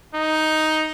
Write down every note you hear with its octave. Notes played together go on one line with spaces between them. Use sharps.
D#4